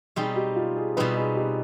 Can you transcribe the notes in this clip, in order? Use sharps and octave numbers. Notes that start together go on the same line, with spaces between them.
B2 G3 C4 D#4 G#4
G4
F4
G#4
B2 G3 C4 D#4 B4
G#4
G4